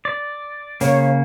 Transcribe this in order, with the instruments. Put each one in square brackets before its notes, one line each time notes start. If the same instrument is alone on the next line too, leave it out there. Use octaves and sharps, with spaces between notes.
[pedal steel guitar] D5
[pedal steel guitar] C#3 A#3 [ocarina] C#5